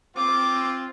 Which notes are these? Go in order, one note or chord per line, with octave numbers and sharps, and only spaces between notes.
C4 F4 D6